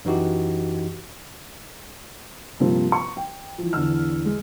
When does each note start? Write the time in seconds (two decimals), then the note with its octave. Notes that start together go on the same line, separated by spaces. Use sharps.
0.05 F#2 E3 D#4 F#4 G4
2.60 G2 C3 F3 A#3 C4
2.92 C#6
3.17 G5
3.58 E3 F3
3.73 E2 D3 E6 F6
4.25 G#3